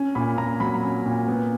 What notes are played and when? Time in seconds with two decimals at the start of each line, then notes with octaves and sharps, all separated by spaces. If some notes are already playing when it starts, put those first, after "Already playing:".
Already playing: C#4
0.15 A#2 B5
0.38 A#2 A#5
0.60 F#3 B5
0.83 C#4
1.06 A#2
1.28 B3